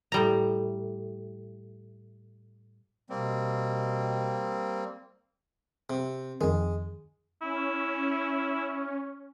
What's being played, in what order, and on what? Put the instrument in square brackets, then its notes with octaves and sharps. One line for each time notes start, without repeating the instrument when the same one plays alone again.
[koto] A2 G3 A#5
[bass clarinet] B2 [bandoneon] G3 A#3 C4
[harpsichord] C3
[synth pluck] F2 D#3 [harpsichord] G#3
[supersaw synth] C#4 [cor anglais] E4